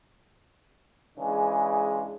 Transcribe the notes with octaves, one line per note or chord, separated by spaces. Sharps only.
C#3 E3 G#3 D4 G#4